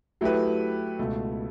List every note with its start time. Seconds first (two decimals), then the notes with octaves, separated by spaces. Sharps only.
0.21 F#3 A3 E4 G4 B4
0.99 C#2 B2 A3